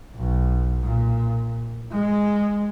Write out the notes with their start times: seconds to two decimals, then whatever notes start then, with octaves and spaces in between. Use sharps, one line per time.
0.15 B1
0.82 A#2
1.92 G#3